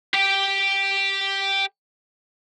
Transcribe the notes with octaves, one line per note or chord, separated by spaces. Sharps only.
G4 G5